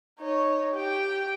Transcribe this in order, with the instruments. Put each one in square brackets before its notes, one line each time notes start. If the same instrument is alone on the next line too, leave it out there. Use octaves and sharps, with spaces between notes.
[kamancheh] D#4 C#5
G4 G5